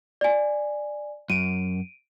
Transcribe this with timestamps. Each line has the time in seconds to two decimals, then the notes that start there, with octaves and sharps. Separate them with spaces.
0.21 D5 G#5
1.30 F#2 D7 D#7